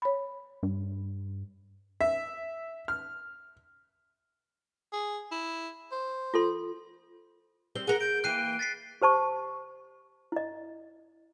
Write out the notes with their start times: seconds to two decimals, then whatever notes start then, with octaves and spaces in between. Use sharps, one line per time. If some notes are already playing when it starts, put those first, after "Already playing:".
0.02 C#5 B5
0.63 G2
2.01 E5
2.88 F6
4.92 G#4
5.32 E4
5.91 C5
6.34 F4 A4 C6
7.75 G3 C4 C5 G7
7.87 G#4 A#4 F#5
8.01 G6 D7
8.24 E3 A#3 G5 F#6 C7 D#7
8.59 A6 B6 C7
9.02 G4 C5 A5 C#6
10.32 E4 D#5